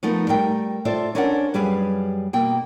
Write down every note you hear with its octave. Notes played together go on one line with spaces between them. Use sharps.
F3 A3 B3 D#4 A#4
G3 A3 A#4 G5
F4 A4 C5 D5 E5
C#4 D4 A#4 C5 E5 F#5
F#2 G3 G#4 B4 F5
B2 A#3 G5